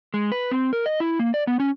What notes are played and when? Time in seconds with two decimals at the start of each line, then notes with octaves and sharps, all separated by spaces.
0.14 G#3
0.32 B4
0.51 C4
0.73 A#4
0.86 D#5
1.00 E4
1.19 A#3
1.34 D5
1.47 B3
1.60 C#4